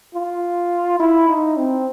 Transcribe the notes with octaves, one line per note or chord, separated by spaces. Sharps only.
F4
E4
D#4
C4